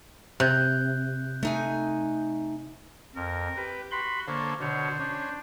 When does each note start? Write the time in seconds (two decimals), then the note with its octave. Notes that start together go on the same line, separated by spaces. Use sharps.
0.40 C3 F#6 G6
1.43 A3 D#4 G#5
3.16 F2 A#4
3.57 G4 B4
3.91 F#4 B5 C6
4.27 D3 A#3 A4 C5 C#5
4.61 B2 D3 C5 C#5
4.99 C#4 D4